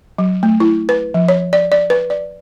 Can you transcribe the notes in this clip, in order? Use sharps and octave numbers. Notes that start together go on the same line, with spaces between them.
F#3
A3
E4
B4
F3
C#5
D5
D5
B4
D5